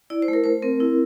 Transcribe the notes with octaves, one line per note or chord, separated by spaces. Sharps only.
E4 D5
C5
A3
A#4
A3 C5
C4 A#4
E4